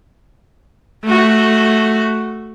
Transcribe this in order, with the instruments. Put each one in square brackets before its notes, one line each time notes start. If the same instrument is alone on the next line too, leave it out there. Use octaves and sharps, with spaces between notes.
[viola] A3 F#4